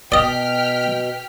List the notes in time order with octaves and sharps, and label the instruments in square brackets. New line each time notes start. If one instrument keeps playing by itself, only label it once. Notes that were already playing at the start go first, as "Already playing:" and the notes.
[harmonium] B2 [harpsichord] D5 D#5 [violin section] G5 F6 B6